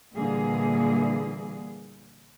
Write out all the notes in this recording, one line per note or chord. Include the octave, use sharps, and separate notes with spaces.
A#2 D3 E3 G3 A#3 G#4